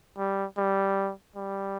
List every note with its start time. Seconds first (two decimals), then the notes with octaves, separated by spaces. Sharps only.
0.18 G3
0.57 G3
1.36 G3